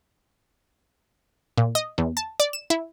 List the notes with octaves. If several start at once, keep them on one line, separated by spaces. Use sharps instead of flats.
A#2
D#5
E2
A5
D5
E7
E4